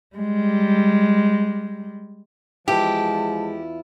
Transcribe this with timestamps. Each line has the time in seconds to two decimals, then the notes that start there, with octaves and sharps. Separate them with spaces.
0.16 G3 G#3
2.68 E2 F3 G#3 E4 F4 G4 A5